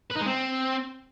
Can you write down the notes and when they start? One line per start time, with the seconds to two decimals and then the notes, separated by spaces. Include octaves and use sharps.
0.10 B4
0.15 D#4
0.21 G#3
0.26 C4